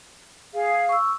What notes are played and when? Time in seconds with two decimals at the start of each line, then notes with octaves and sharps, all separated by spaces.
0.53 G#4 F5
0.89 C#6 E6